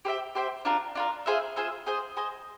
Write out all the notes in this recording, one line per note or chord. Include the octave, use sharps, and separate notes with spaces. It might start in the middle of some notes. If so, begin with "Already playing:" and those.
G4 C5 E5 G5
G4 C5 E5 G5
D4 F4 A#4
D4 F4 A#4
F4 G#4 C5 E5
F4 G#4 C5 E5
G#4 C5 D#5
G#4 C5 D#5